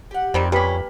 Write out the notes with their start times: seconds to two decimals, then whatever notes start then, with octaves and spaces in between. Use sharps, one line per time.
0.11 G4 F#5
0.34 F2 D#3 G3 C4
0.52 G3 A#3 C#4 G4 B4 A5 B5